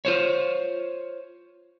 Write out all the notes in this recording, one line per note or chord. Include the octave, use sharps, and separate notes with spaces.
F4 C5 C#5